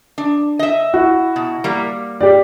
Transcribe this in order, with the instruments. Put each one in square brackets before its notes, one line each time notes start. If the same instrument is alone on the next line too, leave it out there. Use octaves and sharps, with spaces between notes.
[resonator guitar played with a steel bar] D4
D#5 E5
[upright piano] E4 F#4
[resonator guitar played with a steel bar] B2
G3 A#3
[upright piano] G4 D5